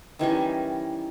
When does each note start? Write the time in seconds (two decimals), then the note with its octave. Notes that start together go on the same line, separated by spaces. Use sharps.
0.19 D#3 E3 G3 C#4